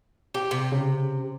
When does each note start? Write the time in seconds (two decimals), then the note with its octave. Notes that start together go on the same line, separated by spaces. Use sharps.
0.34 G4
0.51 C3
0.72 C#3